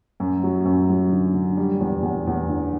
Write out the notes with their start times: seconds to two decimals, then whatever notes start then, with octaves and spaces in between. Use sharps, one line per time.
0.20 F#2
0.44 F#3
0.65 F#2
0.89 F#3
1.12 D3
1.34 D3
1.57 G3
1.80 E2
2.03 E2
2.27 E2
2.50 D3